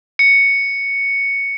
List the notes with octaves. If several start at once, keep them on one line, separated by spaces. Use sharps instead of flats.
C#7